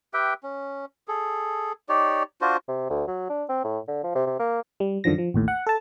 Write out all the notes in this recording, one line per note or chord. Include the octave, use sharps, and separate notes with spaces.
G4 B4 E5 G5
C#4
G#4 A4
D#4 G4 C#5 D5
D4 F4 F#4 C5
C3
D2
F#3
D4
C4
A2
D3
F3
C3
C3
A#3
G3
F#2 D3 D#3 F3 A#6
F3
A1 D#2 A2
F#5
A4 A5